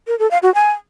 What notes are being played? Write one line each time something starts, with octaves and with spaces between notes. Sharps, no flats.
A#4
A4
F5
F#4
G#5